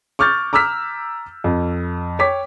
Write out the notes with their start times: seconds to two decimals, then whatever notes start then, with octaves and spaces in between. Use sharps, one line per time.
0.19 C#6 D6 F6 G6 A6
0.53 A#5 D6 E6 F6 B6
1.44 F2
2.19 C#5 G5 D6 B6